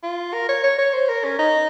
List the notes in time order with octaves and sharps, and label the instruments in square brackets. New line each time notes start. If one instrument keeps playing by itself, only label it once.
[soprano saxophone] F4
A#4
C#5
C#5
C#5
C5
A#4
C#4
D#4